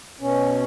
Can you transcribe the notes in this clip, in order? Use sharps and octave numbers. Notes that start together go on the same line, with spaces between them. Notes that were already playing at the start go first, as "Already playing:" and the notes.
B2 C#4